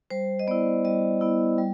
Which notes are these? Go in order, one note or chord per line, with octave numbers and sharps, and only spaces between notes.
G3 C5
D#5
B3 E4 D5
G3 D#5
B3 E4
G3